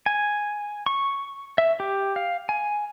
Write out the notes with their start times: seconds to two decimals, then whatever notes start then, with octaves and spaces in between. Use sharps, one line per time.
0.06 G#5
0.86 C#6
1.58 E5
1.80 G4
2.16 F5
2.49 G#5